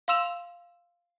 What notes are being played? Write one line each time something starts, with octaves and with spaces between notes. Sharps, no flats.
F5 C6 E6 E7 F7